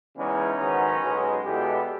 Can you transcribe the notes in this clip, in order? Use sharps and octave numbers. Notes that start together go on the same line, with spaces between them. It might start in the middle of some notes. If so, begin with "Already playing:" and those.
E2 C#3 E3 G#3 B3 C#4 D#4
G#2 D#3 F#3 B3
B1 B2 G#3 B3
E2 B2 G#3 B3 G4 A4